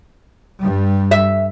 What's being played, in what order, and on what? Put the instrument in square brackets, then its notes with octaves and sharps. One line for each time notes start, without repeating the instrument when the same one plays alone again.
[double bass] G2 G3
[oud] E5